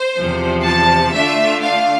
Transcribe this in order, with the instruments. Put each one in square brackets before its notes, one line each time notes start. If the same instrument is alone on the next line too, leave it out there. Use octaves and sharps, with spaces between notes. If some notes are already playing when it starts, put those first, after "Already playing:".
Already playing: [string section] C5
E2 C3 F3
A5
D3 A3 D4 F4 E5
F5